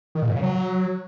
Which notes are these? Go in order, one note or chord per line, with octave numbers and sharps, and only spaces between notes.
D#3
A#2
G#2
C#3
F#3